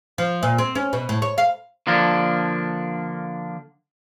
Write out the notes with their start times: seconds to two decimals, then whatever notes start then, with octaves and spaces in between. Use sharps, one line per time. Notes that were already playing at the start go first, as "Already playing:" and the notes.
0.18 F3
0.43 A#2
0.58 C4
0.75 C#4
0.93 B2
1.09 A2
1.22 C#5
1.38 F5
1.87 D3 F3 A#3 D4